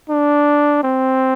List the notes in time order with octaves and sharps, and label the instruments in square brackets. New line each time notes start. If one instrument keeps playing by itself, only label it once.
[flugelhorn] D4
C4